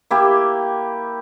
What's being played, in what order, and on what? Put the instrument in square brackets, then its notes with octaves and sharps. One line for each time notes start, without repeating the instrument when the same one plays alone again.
[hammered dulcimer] A#3 E4 G4